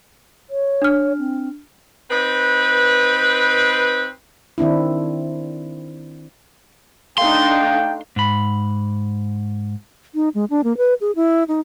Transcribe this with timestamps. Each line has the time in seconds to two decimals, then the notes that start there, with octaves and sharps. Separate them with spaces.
0.50 C#5
0.82 D4 F6
1.18 C4
2.10 C4 D#4 B4
4.58 D#3 C4 D4 E4
7.18 A3 D4 D#4 F5 G5 C6
8.16 G#2 B5
10.15 D#4
10.35 G#3
10.50 D4
10.64 A#3
10.77 B4
11.01 G#4
11.16 E4
11.48 D#4